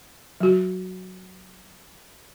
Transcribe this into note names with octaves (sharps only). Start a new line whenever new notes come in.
F#3 F#4